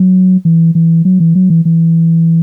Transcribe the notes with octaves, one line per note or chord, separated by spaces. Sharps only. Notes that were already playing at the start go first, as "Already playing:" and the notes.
Already playing: F#3
E3
E3
F#3
E3
F#3
E3
E3